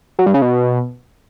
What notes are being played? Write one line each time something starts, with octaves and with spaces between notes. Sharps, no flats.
F#3
G2
C#3
B2